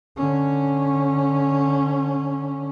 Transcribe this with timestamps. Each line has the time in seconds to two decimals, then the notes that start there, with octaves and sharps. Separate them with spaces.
0.17 D3 C#4